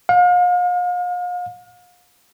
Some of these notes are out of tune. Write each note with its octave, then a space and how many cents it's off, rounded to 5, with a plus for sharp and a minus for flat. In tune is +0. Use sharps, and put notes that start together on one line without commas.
F5 +40